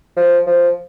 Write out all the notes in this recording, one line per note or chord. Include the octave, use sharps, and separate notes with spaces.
F3
F3